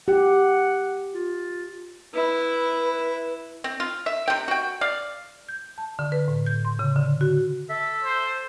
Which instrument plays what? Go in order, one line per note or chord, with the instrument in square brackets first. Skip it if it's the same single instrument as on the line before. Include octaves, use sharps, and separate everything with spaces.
[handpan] G4 [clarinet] F#5
[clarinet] F4
[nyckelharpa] E4 [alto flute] B4
[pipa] C4
F4
E5
C3 G5
F#4 G5
D5 F5
[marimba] G6
A5
D3
B4
A2
G6
C6
C#3
D3
F#4
[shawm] A4 [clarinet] E5
[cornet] C5